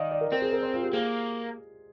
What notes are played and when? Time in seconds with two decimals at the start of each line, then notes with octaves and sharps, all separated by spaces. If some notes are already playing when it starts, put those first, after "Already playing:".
Already playing: D#3 D5 D#5 F5
0.11 D5
0.21 A#4
0.32 C4 A#4
0.42 G#4
0.53 A#4
0.63 C5
0.74 F4
0.83 G4
0.93 A#3 G#4